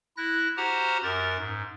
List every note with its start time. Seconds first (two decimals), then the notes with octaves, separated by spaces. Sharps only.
0.17 E4 F#6 A#6
0.57 F#4 G4 C5 F#5 A#5 F6
1.03 F#2 A#4 A6
1.39 G#2